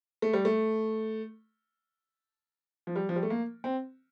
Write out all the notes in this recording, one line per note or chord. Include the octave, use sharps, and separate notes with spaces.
A3
G3
A3
F3
G3
F3
G3
A3
A#3
C4